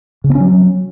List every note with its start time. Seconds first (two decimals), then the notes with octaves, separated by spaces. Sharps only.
0.24 C#3
0.30 B3
0.35 C#4
0.40 F#3